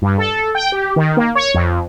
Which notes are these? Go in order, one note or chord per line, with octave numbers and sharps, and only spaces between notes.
G2
A4
G5
G4
D#3
A#3
C#5
F2